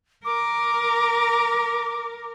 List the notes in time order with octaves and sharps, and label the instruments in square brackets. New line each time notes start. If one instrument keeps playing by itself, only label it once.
[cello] A#4 [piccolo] D6